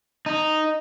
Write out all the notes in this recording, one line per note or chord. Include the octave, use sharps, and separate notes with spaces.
D#4